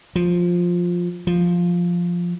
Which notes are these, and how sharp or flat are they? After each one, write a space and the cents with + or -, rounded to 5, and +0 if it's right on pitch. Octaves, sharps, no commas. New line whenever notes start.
F3 +10
F3 +0